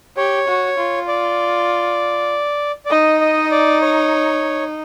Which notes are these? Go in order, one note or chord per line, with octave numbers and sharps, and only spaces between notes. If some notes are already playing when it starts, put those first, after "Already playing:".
G4 C#5
F#4
F4
D5
D5
D#4 D#5
D#5
D5
C#5